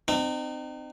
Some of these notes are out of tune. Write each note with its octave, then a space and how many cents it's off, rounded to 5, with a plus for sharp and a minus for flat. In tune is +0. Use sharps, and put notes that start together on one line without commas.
C4 -20 D#4 -40